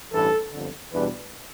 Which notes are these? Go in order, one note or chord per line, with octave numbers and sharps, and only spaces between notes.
A1 G2 E3 A4
G1 F2 D3
E2 B2 G3 D4 B4